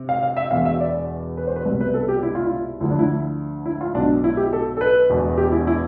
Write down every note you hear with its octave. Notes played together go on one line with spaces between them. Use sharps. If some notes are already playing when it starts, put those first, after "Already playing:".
Already playing: C3
F5
F5
E5
E1 E2 B2 F5
E5
D5
B4
C5
B4
C2 B2
B4
A4
G4
E4
F4
E4
D2 D3 F3 E4
D4
E4
E4
F4
B1 B2 D4
E4
G4
A4
A4
B4
E1 E2 B2
G4
E4
E4